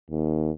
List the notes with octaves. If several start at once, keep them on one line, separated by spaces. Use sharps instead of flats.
D#2